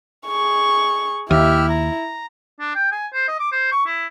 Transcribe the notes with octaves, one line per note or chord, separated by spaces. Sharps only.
G#4 C#6
D#2 E4 G4 E5 F6
A#5
D4
G5
G#5
C5
D#5
D6
C5
C#6
E4